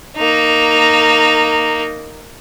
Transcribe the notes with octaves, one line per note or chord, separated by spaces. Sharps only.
A#3 D#4